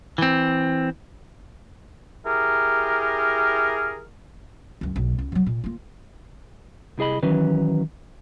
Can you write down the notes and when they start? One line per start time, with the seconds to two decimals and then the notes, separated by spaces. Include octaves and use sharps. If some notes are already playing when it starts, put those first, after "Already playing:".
0.18 E3 C4
2.25 E4 G4 G#4 A#4
4.81 C#2 F#2
4.96 E1 B1
5.19 C#2
5.32 B2 F#3
5.46 A#2
5.64 A#3 F4
6.98 C2 E4 G#4 D#5 B5
7.23 D#3 E3 F#3 C#4 B4